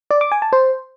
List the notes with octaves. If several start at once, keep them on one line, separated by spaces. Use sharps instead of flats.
D5
D6
G#5
A5
C5